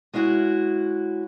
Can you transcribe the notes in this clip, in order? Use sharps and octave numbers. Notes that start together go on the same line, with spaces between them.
G#3 C#4 E4 F#4